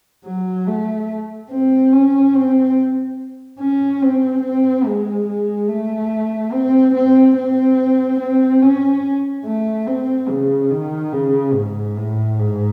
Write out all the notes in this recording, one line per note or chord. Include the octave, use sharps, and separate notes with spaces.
F#3
A3
C4
C#4
C4
C#4
C4
C4
G#3
G#3
A3
C4
C4
C4
C4
C#4
A3
C4
C#3
D#3
C#3
G#2
A2
G#2